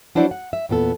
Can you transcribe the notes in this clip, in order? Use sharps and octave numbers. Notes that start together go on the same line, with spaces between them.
F#3 D4 E4 C5 D5 F#5
F#5
E5
E2 A#2 B3 A4